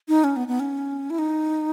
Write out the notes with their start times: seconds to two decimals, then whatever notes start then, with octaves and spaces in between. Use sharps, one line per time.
0.08 D#4
0.24 C#4
0.36 B3
0.48 B3
0.60 C#4
1.10 E4
1.19 D#4